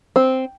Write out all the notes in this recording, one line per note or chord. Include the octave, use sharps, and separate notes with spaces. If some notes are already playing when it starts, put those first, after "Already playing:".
C4